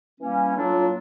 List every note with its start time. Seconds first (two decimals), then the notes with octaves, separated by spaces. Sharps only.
0.20 E3 G3 A#3 C#4
0.55 A2 F#3 A#3 D4 F4